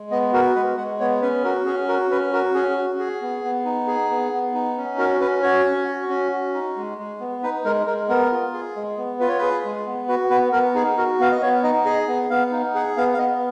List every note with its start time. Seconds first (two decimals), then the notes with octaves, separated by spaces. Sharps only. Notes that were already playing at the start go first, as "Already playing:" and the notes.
Already playing: G#3
0.11 B3 D#5
0.33 F#4 A#4
0.55 G#3 B4
0.77 G#3 F#5
1.00 B3 C#5
1.22 C#4 B4
1.44 F#4 A#4
1.66 C#4 G#4
1.88 F#4 A#4
2.10 C#4 B4
2.33 F#4 A#4
2.54 C#4 G#4
2.77 F#4
2.99 G#4
3.22 B3
3.44 B3
3.65 D#4
3.87 G#4
4.10 B3
4.33 B3
4.54 D#4
4.77 C#4
4.98 F#4 A#4
5.21 C#4 B4
5.43 F#4 C#5
5.65 C#4
5.88 F#4
6.09 C#4
6.32 F#4
6.54 D#4
6.76 G#3
6.98 G#3
7.20 B3
7.43 D#4 B4
7.65 G#3 A#4
7.87 G#3 A#4
8.09 B3 A#4
8.32 F4
8.54 G#4
8.76 G#3
8.97 B3
9.20 F4 B4
9.29 C#5
9.38 G#4 B4
9.65 G#3
9.86 B3
10.08 F#4 B4
10.30 B3 B4
10.52 B3 A#4
10.75 D#4 G#4
10.97 F#4 A#4
11.19 B3 F5
11.32 D#5
11.41 B3 C#5
11.63 D#4 D#5
11.85 G#4 D#5
12.07 B3
12.30 B3 F5
12.52 D#4
12.74 G#4 F#5
12.97 B3 F5
13.14 F5
13.18 B3 D#5